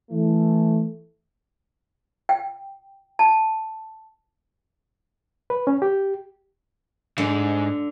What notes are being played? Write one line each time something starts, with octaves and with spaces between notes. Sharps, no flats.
E3 A3
G5
A5
B4
C#4
G4
G#2 D3